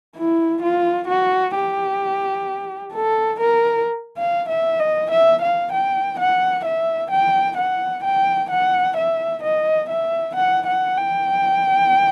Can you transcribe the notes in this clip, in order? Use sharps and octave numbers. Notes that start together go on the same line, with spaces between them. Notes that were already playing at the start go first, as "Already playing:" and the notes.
E4
F4
F#4
G4
A4
A#4
F5
E5
D#5
E5
F5
G5
F#5
E5
G5
F#5
G5
F#5
E5
D#5
E5
F#5
F#5
G5